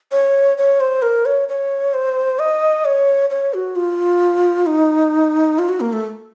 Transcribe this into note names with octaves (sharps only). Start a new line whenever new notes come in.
C#5
C#5
C5
A#4
C#5
C#5
C5
D#5
C#5
C#5
F#4
F4
D#4
F4
F#4
A#3
A3